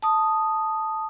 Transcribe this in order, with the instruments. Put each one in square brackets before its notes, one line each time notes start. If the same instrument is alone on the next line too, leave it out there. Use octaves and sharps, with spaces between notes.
[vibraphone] A5 D#6